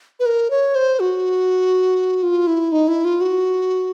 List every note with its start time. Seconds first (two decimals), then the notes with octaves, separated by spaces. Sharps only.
0.20 B4
0.26 A#4
0.51 C#5
0.75 C5
1.00 F#4
2.23 F4
2.47 E4
2.72 D#4
2.88 E4
3.05 F4
3.21 F#4